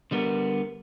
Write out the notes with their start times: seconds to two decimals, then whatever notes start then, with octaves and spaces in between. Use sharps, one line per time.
0.11 D3 G3 B3 E4 A#4